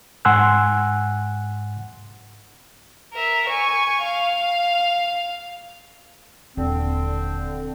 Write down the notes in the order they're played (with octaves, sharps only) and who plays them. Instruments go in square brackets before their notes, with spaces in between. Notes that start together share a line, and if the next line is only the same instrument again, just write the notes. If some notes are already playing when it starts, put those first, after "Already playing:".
[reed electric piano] G#2 F#5 G#5 C6 E6 F#6
[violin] A#4 E5
G#5 C#6
F5
[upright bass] D#1 [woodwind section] D3 C4